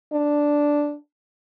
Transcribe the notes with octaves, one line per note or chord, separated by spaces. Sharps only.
D4